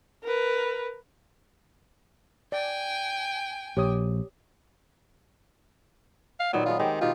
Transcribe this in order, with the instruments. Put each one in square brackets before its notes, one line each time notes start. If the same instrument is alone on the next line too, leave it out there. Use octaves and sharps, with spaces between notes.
[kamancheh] A#4 B4
[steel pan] D5 [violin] G5 G#5
[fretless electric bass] A#1 [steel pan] G4 C#5 D#6
[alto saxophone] F5
[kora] A#2 D#3 B3 [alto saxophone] F#3
[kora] F#3 G#3 B3 [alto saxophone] F4
[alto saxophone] D#3 [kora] G#3 C4 G4
[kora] B2 D#3 G4 [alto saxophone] F4